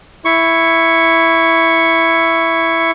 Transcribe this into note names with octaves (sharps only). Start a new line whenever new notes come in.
E4 C#6